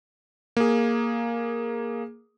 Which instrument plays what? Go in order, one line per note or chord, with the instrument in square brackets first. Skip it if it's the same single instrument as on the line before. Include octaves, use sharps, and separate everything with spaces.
[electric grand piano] A#3 G#4